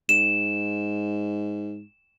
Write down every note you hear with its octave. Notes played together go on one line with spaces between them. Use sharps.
G#2 E7